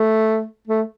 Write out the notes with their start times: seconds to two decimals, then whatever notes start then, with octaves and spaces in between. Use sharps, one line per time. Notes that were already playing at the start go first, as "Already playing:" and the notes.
Already playing: A3
0.68 A3